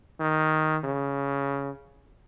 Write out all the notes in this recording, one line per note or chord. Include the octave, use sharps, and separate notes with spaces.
D#3
C#3